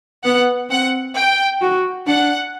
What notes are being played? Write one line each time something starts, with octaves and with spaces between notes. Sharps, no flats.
B3 F#5
C4 F#5
G5
F#4
D4 F#5